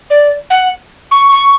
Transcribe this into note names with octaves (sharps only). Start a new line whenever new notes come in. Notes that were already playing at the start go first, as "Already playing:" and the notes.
D5
F#5
C#6
C#6